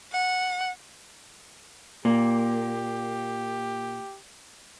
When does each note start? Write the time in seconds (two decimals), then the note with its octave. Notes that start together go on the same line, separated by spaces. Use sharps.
0.12 F#5
2.05 A#2 A#3 G4